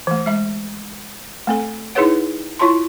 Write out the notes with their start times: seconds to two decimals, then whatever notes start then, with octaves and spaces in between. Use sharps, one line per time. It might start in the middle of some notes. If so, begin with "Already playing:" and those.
0.07 E3 A3
0.26 G#3 E5
1.47 A3 C4 A4
1.95 D#4 E4 G#4 B4 C#5 F#5
2.59 E4 F4 C#5 A5 C6